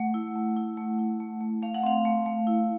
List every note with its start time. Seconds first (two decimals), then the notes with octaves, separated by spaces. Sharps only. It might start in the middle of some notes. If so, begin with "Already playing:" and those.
Already playing: A3 F#5
0.14 E4
0.36 A3
0.57 E4
0.77 A3
0.99 E4
1.20 A3
1.41 A3
1.62 A3 F5
1.74 F#5
1.83 C4 F5
2.05 A3
2.26 A3
2.47 E4